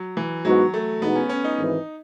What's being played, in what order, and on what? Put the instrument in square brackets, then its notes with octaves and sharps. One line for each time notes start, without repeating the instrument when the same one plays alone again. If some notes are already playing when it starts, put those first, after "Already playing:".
Already playing: [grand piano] F#3
E3
[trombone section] G#2 E3 B3 F#4 [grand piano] F#3
[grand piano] A3
[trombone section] E2 B2 G#3 D#4 F#4 [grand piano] B3
[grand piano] C#4
C#4
D#4
[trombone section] G#1 G#2 E3